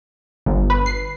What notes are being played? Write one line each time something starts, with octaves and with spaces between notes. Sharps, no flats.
G1
B4
C7